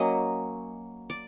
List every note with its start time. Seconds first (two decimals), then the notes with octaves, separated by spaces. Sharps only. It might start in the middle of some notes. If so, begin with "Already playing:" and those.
Already playing: F#3 A#3 C#4 D#5
1.10 D5